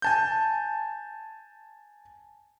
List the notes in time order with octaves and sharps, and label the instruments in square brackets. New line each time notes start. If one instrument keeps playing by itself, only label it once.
[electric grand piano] G#5 A5 G6